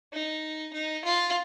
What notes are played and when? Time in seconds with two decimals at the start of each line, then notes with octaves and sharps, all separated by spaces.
0.13 D#4
0.73 D#4
1.05 F4